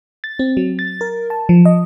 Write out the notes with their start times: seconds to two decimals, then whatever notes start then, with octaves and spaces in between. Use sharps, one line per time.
0.24 A6
0.39 C4
0.57 F#3
0.79 A6
1.01 A#4
1.30 A5
1.49 F3
1.65 D#5